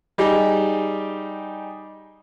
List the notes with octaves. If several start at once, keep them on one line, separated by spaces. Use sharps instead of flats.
G3 D#4 G4 G#4